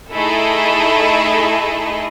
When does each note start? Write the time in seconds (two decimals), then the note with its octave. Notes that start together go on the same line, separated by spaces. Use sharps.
0.13 A3 D#4 E4 G#4 A4 D#5